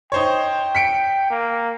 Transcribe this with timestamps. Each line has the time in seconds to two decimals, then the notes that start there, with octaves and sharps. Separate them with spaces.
0.12 D#4 C5 C#5 G5
0.75 B6 C#7 D7
1.30 A#3